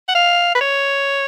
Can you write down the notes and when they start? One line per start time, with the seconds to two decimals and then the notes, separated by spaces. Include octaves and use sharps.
0.08 F#5
0.15 F5
0.55 B4
0.61 C#5